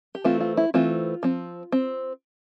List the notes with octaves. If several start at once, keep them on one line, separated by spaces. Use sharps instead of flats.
G4
E3 A3 C4 F4
F4
E4
E3 A3 C4 F4
F3 C4
C4